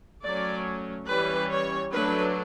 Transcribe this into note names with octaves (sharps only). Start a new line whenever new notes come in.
F#3 A3 C#4 D5
E3 G3 C#4 B4
C#5
F#3 A3 D4 B4